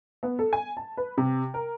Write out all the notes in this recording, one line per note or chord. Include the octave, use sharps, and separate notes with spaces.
B3
A4
G#5
A5
B4
C3
A#4